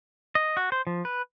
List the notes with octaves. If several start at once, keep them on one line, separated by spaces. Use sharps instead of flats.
D#5
F#4
C5
F3
B4